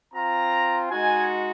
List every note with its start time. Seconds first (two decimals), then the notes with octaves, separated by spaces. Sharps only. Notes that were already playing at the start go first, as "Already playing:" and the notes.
0.14 C4 F4 A#5
0.90 G#3 D#4 F#4 G#5